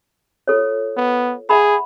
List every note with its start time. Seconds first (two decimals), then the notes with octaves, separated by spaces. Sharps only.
0.48 F4 A4 C#5
0.97 B3
1.49 G#4 E5 F#5 B5